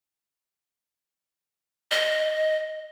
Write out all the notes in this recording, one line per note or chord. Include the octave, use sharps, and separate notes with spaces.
D#5